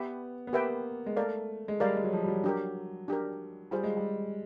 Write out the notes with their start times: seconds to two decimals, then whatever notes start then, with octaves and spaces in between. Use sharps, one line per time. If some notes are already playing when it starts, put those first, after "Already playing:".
Already playing: B3 G4 B4 E5 G5
0.47 B3
0.53 A#3 G4 B4 E5 G5
1.06 G#3
1.16 A3 A#4 D5 F5
1.68 G#3
1.80 G3 A#4 D5 F5
1.97 G#3
2.04 F#3
2.13 F3
2.24 G3
2.28 F#3
2.44 D4 G4 A#4
3.08 D4 G4 A#4
3.71 G3 F4 G#4 C5 F5
3.84 G#3
3.97 G3